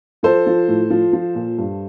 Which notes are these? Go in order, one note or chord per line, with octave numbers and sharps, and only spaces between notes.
F3 A4 C5
F3
A2
F3
F3
A#2
G2